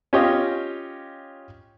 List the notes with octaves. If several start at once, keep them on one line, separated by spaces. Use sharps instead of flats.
C#4 F4 G4 C#5 D#5